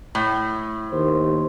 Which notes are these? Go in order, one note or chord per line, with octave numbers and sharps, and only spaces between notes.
A2
D#2 C5